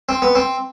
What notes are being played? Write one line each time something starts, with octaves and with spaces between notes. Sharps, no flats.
C4
B3
C4